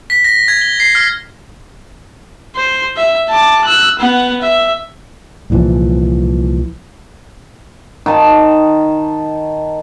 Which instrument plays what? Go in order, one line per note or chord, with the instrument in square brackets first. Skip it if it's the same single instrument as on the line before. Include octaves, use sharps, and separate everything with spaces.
[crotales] B6
A#6
G#6
G7
C7
F6
[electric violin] C5
E5
A5 D6
E6 F#6
B3 F#5
E5
[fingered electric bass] C2 A#2 E3 F3
[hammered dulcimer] D#3 A5